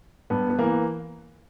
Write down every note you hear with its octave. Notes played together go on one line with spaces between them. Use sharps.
G2 B3
B3
E3 A#3